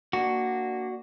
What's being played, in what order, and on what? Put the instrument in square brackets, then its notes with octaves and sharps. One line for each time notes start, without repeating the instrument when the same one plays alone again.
[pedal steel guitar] A#3 D4 [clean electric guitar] F#4